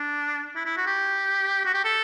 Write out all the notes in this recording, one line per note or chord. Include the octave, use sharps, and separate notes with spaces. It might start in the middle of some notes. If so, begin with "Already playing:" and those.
Already playing: D4
E4
E4
F#4
G4
F#4
G4
A4